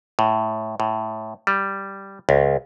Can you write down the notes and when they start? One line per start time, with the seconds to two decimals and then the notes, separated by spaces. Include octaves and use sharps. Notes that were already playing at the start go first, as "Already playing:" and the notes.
0.19 A2
0.80 A2
1.47 G3
2.29 C#2